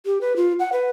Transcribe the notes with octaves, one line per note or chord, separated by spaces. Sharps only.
G4
B4
F4
F#5
B4